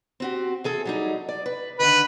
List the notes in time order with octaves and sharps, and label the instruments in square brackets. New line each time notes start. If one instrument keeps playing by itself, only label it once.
[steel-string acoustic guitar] C4 F#4 G4
E3 G#4 A4
F#3 G3 D#4
D5
B4
[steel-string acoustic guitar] D3 D#3 [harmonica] B4